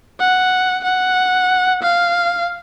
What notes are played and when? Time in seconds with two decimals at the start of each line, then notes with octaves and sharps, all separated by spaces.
0.20 F#5
0.84 F#5
1.83 F5